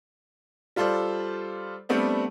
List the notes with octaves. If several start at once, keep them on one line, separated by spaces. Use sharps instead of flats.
G3 F4 A4 C5 D5
G3 A3 B3 C4 D4